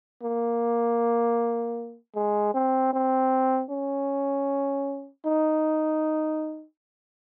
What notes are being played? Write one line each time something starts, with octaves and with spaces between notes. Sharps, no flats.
A#3
G#3
C4
C4
C#4
D#4